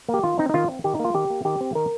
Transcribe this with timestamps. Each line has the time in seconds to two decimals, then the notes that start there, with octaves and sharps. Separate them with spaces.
0.09 A#3
0.14 G4
0.23 D#3 F4
0.39 C4 D#4
0.49 D#4
0.54 D#3 F4
0.69 C4
0.84 D#3 G4
0.95 D#4
0.99 A#3
1.05 F4
1.14 D#3 G4
1.30 A#3
1.45 D#3 G4
1.61 C4
1.75 D#3 A#4